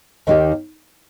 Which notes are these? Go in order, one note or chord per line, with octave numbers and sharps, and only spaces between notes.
D#2 D#3 A#3 D#4 G4